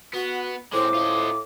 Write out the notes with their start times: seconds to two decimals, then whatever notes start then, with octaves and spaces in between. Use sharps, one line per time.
0.14 B3 F#4
0.73 A2 G#3 C4 C5 D6
0.95 F4 D#5